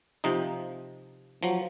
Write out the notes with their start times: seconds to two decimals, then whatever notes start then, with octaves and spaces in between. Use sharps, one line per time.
0.24 C3 F3 D#4
1.43 F3 F#3